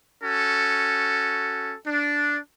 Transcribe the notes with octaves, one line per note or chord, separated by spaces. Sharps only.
C#4 F#4 A4
D4